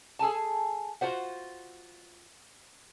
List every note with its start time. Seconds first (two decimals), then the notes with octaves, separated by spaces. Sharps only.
0.19 G#4 A4 G#5 A5
1.01 F4 F#4 C5 F#5